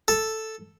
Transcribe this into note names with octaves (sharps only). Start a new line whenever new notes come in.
A4